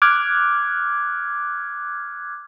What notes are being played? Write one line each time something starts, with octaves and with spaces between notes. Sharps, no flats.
D6 F6 F#6 G#6